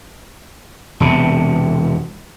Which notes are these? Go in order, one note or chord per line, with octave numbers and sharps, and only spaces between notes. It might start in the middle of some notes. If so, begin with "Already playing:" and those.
E1 C3